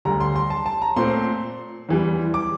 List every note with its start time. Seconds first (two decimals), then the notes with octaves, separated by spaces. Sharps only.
0.05 D2 D3 G3 A#5
0.20 C6
0.36 C6
0.50 A5
0.66 A5
0.82 A#5
0.96 A#2 A3 C4 C6
1.89 E2 E3 G3
2.34 D6